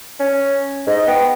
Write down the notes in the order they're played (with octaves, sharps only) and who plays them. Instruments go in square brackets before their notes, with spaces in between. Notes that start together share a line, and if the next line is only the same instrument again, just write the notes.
[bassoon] C#4
[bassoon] G#2 [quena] D#5
[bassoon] B3 [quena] G5